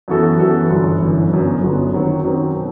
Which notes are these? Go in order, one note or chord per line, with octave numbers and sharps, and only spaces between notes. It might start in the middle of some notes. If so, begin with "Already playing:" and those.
F#2 E3 B3 F#4 A4
F#2 E3 B3 F#4 A4
G1 F#2 E3
G1 F#2 E3
G1 F#2 F#3 B3
G1 F#2 F#3 B3
F#2 D#3 F#3 C4
F#2 D#3 F#3 C4
B2